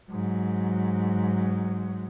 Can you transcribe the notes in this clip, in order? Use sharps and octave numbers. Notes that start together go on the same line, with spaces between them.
G#2 F#3